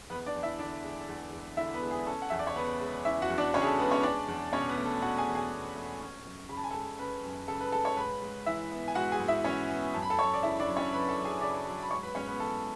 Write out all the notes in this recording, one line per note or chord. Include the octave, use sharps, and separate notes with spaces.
E2 B3 B4
D4 D5
E2
E4 E5
D3 D4 D5
G#3
E2
E2
D3 E4 E5
B3 B4
G#3
G#4
C#4 A4
F#5
E2 E5
D5
C#5
C#3 B3 B4
G#3
C#4 E4 E5
F#4 F#5
E2
D4 D5
C#3 C#4 C#5
G#4
A4
G#3 B3 B4
C#4 C#5
C#4 D4 D5
E2
B2 C#4 C#5
B3 B4
A3
A4
C#4 F#4 F#5
G#4 G#5
E2
G#4 G#5
B2
A3
C#4
F#2
C#3 B5
A5
G#5
G#3 A4 A5
C#4 B4 B5
F#2
C#3 A4 A5
B4 B5
G#3 A4 A5
C#5 C#6
G#2 B4 B5
G#2
E3 E4 E5
B3
G#5
G#2 F#4 F#5
G#4 G#5
G#2
E4 E5
E3 C#4 C#5
B3
F#2 A5
B5
A4 A5
F#2 C#5 C#6
D5
C#3 E4 E5
D4 D5
F#3
C#4 C#5
F#2 B4 B5
A4 A5
F#2
G#4 G#5
C#3 D5 D6
F#3
B5
G#2 C#5 C#6
B4 B5
G#2 C#4 C#5
B3 B4
E3 A4